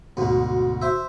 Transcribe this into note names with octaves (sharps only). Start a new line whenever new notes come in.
D2 G#2 B2
C5 E5